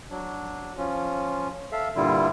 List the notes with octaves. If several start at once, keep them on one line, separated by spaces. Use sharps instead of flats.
F#3 D4
F3 C#4 F4
A4 E5 F5
G2 A#2 D3 G3 E4 F4